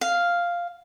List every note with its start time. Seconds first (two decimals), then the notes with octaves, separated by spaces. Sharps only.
0.01 F5